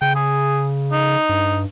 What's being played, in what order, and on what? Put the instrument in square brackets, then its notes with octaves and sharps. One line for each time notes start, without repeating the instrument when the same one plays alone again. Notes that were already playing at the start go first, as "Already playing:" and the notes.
[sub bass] C#3 [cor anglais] G5
[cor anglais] G#4
D#4
[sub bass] G2